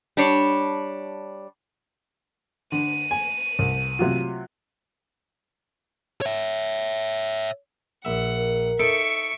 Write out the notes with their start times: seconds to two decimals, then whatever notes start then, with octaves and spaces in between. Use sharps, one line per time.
0.17 G3 D4 C#5
2.72 D3 D#7
3.11 G#5
3.59 C2
3.99 C3 F#3 F4
6.22 C#5 E5
8.05 A#1 E5 F#5
8.36 A#4
8.79 D#4 A4 C5 E5 C#6 C#7 D7